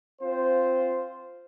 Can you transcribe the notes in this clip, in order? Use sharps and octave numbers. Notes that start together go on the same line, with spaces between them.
C4 F4 C5